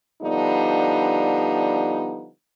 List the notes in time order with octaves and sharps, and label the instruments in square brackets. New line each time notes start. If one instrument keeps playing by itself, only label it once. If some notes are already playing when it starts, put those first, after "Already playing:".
[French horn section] D3 F3 G3 B3 D4 D#4